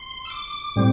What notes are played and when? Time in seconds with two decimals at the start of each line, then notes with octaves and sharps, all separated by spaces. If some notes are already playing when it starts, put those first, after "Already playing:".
Already playing: C6
0.25 E6
0.30 D6
0.76 A2 G3 C4